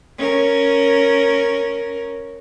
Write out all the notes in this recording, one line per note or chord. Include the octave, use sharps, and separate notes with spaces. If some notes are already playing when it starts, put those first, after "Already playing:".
C#4 A#4